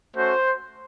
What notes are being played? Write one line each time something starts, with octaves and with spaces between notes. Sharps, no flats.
A3 C#4 F#4 C5